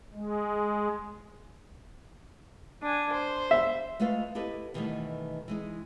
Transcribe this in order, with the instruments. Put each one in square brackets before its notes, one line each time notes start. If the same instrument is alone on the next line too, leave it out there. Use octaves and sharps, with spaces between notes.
[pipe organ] G#3
[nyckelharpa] D4 G#5
C5
[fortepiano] E5
[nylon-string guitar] G#3 A3 F4 B4 F5
E4 G4 A4 B4 D#5
B2 D#3 E3 G3 A3 B3
E3 G#3 D#4